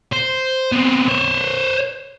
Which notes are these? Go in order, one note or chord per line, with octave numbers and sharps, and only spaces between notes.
C5
B3 C4
C5 C#5